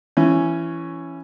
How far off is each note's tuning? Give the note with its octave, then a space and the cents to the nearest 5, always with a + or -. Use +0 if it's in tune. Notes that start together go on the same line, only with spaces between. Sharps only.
E3 +20 C#4 +0